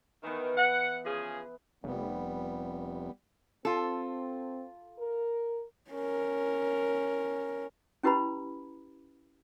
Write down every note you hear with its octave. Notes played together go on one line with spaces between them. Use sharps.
D#3 E3 B3
F#5
C#3 F3 G#4
F1 G3 B3
C4 F4 A4
A#4
C#4 A#4
C#4 E4 G4 B4 A#5 B5